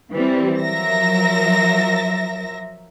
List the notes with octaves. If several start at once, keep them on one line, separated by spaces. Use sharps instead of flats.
E3 G3 C4
F3 F#3 A#4 E5 A#6